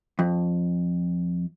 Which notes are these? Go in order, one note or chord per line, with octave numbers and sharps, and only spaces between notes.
F2